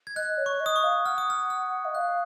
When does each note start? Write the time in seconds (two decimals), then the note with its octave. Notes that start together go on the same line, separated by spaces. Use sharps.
0.07 G#6
0.16 D#5 F#6
0.38 C#5
0.46 C#6
0.60 D#5
0.66 D#6
0.76 C#6
0.84 F5
1.05 F#5 F6
1.18 D#6
1.30 F6
1.50 F6
1.85 D#5
1.95 F5 F#6